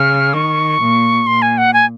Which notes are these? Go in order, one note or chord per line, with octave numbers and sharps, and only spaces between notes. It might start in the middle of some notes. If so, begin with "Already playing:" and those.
Already playing: C#3 F6
D#3 C#6
A#2
A#2 C6
G#5
F#5
G#5